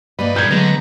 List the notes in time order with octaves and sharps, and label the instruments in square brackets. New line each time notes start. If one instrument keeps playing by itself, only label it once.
[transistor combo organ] G2 B4 [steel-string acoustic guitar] A#3 D5 D#5
[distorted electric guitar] A#2 G#3 [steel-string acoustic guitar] A#4 [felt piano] G6 G#6
[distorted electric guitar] D3 [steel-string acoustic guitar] F#3 G#3 A3 [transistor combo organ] B3 A#5